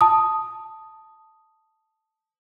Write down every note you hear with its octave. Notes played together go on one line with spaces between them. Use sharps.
A5 D#6